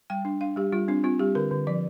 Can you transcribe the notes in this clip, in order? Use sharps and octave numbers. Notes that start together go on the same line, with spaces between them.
G3 G5
D4
D4 F5
G3 G4
G3 F4
C4 D4
C4 F4
G3 G4
D3 A#4
D3
F3 D5